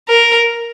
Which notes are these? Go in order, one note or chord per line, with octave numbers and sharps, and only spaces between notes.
A#4